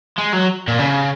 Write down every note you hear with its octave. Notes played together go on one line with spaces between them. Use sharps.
G#3
F#3
A#2
C#3